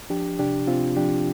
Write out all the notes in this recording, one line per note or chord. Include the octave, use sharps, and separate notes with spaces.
F3 D4 G4
C3 D4 G4
C3 C4 F4
F3 D4 G4